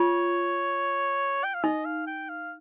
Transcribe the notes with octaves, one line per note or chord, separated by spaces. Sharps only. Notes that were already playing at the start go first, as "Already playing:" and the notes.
Already playing: F4 C#5
G5
F5
D#4 D#5
F5
G5
F5